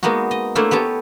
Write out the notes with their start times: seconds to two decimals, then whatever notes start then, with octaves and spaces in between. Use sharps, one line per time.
0.03 G#3 A#3 B3 D#4 F#4
0.31 D#5
0.55 A3 A#3 D4 E4 C5 C#5
0.71 B3 G4 C#5 A5